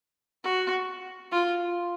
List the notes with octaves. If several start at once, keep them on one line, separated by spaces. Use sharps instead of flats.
F#4
F4